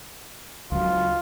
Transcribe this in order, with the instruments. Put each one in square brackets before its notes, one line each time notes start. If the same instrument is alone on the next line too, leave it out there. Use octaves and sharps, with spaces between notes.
[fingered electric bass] C#2 F#3 [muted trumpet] F4